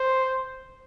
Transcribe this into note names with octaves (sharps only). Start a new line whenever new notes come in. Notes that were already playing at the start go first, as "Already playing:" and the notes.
Already playing: C5